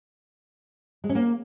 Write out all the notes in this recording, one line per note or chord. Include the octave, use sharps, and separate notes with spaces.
G#3
C#4
A#3